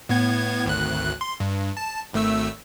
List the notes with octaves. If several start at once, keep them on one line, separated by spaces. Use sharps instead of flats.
A2 B3 G#6
G#1 D2 F#6
C6
G2
A5
G#1 A3 E6